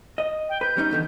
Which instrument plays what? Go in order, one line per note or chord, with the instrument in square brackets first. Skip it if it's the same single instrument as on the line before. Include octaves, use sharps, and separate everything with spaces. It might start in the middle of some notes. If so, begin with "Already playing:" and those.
[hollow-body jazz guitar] D#5
[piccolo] G5
[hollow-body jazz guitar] B4 [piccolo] G6
[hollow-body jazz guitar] G3 C#4 D#4
E2 D3 D#3